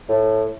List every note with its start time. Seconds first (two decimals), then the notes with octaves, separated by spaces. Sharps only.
0.09 A2